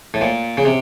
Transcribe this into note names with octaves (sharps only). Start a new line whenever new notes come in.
A2
A#2
C#3
C3